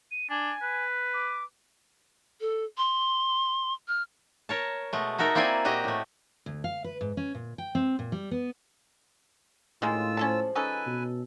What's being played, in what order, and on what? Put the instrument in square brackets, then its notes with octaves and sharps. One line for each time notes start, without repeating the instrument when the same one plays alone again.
[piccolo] D#7
[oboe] D4 [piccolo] G#5
[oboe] B4
[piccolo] D6
[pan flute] A4
C6
F6
[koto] A#4 C#5 A5
B2 G#3 A3
D#4 F#4 A4 A#4 E5
A#3 C4 E4 C5 D5 G#5
A#2 F#4 G4 D#5 A#5
A2 A3
[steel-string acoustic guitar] D2
F5
B4
G#2
C#4
A#2
G5
C4
A#2
G3
B3
[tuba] A2 [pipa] D#3 G#3 A#3 [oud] C#4 E4 [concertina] F4 E6
[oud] F3 G#3 [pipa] C#4 A4 A5
[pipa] C#4 D#4 A4 [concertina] B4 G#5
[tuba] B2